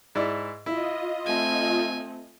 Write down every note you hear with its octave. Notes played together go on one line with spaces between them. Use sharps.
G#2 E4 D5
E4 F4 D#5
A3 C4 G#5